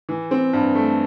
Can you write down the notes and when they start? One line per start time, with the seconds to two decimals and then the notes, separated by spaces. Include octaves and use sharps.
0.09 E3
0.31 C4
0.53 G2
0.75 A3